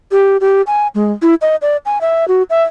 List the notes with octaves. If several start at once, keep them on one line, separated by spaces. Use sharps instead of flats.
G4
G4
G#5
G#3
E4
D#5
D5
G#5
E5
F#4
E5